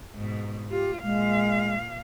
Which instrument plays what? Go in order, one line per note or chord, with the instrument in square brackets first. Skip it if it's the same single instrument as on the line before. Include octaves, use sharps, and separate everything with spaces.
[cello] G#2 B2
[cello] F4 [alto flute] G4
[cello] A#2 F5 [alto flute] G#3